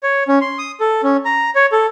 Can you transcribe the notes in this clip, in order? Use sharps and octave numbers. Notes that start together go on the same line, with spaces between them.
C#5
C#4
C6
D#6
A4
C#4
A#5
C#5
A4